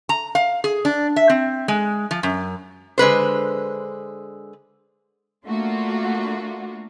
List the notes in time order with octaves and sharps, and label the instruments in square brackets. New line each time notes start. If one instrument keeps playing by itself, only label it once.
[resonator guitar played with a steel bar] A#5
F5
G#4
D4
E5
C4
G#3
F3
F#2
D3 G#3 B4 C5
[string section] A3 A#3 D4 F4 F#4